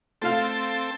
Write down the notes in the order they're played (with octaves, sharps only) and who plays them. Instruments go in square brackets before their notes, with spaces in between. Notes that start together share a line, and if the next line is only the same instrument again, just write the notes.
[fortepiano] A3 F4 F5 [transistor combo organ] C4 A4